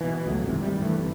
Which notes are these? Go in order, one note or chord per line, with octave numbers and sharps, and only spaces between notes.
B2 E3
C#2 F#3 G#3 A3
G1 G#2 C3 E3
D#3 E3 G3
G2 E3 A3
F#1 C3